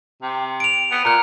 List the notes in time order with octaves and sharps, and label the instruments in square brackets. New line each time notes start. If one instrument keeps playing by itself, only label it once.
[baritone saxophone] C3
[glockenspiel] D7 F7
[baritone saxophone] B3
[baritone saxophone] A#2 [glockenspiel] A#5 F#6